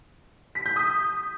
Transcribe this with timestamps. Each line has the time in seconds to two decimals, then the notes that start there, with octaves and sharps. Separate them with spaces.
0.55 B6
0.66 G6
0.76 D#6